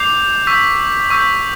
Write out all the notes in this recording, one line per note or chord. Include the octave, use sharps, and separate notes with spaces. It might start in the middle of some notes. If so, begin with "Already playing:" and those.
Already playing: D6 G6 C7 F7
C#6 E6 G6 B6
C#6 E6 G6 B6